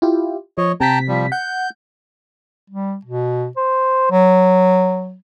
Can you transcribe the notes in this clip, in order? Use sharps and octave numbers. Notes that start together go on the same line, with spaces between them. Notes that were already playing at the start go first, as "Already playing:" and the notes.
E4 F4 G4
F3 C#5 D#5
C3 G5 A5 A#5 B6
F3 G3
F#5 G6
G3
B2
C5
F#3